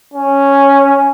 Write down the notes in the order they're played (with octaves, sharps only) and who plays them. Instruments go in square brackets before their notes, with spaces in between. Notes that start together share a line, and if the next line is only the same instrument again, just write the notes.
[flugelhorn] C#4